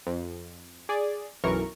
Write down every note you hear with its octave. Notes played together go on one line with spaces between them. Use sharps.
F2
G#4 D5
B1 F#2 E3 A#4 C#6